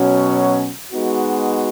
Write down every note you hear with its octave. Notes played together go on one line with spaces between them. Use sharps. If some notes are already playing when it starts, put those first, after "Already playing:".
Already playing: B2 F#3 C#4
G#3 B3 D#4 F#4